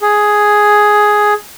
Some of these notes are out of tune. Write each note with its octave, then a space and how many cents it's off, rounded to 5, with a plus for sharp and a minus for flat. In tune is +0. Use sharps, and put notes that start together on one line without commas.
G#4 +5